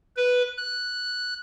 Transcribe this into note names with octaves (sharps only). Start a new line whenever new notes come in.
B4
F#6